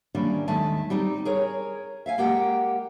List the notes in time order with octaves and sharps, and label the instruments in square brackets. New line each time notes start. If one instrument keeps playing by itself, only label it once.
[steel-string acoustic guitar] D#3 E3 G3 A#3 C#4 D4
D#2 D#3 G#3 A3 E5 A5
G3 C4 D#4
G#4 A#4 C#5
E5 F5 G#5
G#3 A#3 G4 A#4 F#5 G5